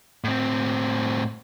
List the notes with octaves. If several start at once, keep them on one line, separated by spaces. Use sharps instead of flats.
A2 C4